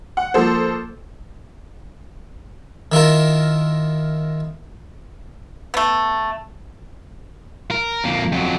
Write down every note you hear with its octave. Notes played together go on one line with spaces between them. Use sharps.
F#5
F3 A#3 A4 C5
D#3 E4 F4 A#4
A3 B3
A#4
F2 A#3
F2 F#3